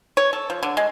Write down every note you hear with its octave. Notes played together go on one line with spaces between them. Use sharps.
C#5
A4
F3
D3
G#3